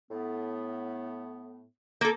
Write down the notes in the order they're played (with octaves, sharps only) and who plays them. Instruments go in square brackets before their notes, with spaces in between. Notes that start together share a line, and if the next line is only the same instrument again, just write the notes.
[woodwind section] A2 B3
[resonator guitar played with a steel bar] A#3 A4